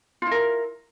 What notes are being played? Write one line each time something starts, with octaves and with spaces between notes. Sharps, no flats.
E4 F4 A#4